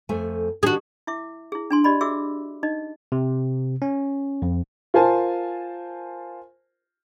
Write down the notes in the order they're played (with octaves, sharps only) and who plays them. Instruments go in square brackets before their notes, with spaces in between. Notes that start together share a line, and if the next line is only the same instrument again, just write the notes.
[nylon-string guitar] F2 A3 G#5
[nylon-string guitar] D#3 D4 [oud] F#4 G#4
[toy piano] E4 E5 D6
E4 G#4
D4 G#5 C6
G4 D5 D#5 B5
F#4 G#4 E5 D6 E6
D#4 D#5
[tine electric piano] C3
C#4
F2
[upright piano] F4 A#4 C5 G#5 A5